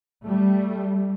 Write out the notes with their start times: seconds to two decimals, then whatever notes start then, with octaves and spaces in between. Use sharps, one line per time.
0.24 G3 A3